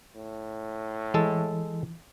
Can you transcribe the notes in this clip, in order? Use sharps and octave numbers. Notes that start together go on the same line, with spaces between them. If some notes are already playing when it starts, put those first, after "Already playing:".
A2
E3 G#3 A4